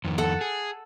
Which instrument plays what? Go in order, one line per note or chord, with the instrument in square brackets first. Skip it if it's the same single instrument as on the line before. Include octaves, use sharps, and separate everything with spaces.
[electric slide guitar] F2 D#3
[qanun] A4 F#5
[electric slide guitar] G#4